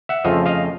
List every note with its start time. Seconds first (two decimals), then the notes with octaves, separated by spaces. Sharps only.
0.09 E5 F#5
0.25 F2 C#3 F3 A3 D#5 F5
0.46 D#5 F5